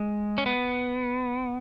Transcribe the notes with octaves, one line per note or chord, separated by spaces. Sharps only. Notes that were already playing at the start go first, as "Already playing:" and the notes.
Already playing: G#3
C#4
B3